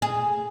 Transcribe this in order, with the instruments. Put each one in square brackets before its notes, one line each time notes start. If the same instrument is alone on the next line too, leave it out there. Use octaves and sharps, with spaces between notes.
[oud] G#4